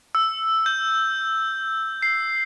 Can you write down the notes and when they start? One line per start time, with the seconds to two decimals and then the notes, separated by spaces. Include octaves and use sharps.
0.15 E6
0.66 G6
2.02 C7